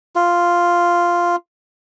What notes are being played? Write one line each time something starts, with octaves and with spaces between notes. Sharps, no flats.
F4